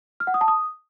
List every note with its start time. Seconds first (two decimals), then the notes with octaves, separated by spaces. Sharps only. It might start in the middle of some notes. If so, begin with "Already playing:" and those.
0.20 F6
0.27 F#5
0.34 D#6
0.41 A5
0.48 D#6